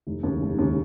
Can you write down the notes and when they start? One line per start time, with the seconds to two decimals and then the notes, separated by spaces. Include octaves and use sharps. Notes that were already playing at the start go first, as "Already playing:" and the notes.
0.07 F1
0.23 D#2 C#3
0.41 F1
0.59 D#2 C#3